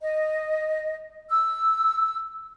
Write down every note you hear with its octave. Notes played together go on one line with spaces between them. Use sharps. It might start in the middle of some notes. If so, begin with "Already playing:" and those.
D#5
E6